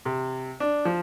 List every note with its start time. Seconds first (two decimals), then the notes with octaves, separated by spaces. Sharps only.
0.05 C3
0.60 D4
0.85 F3